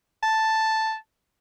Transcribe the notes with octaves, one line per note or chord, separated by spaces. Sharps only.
A5